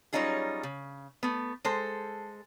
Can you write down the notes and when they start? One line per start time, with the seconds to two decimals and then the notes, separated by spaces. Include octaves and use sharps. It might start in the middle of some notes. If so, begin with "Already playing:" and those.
0.13 F#3 G3 C#4 D#4 F4 G#4
0.63 C#3
1.23 A3 B3
1.65 G#3 A4 C5